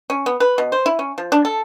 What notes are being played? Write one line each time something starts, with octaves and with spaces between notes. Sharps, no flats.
C#4
B3
B4
B2
C5
E4
C#4
F3
D4
A4